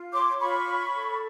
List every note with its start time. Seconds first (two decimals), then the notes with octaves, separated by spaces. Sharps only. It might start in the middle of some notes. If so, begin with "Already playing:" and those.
Already playing: F4
0.12 C#5 C6 D6
0.40 F4 B5 C#6
0.67 C#5
0.95 A4